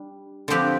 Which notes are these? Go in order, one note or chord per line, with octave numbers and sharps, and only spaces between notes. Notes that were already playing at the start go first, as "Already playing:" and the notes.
Already playing: G3 D4
D3 F3 C4 G4 B4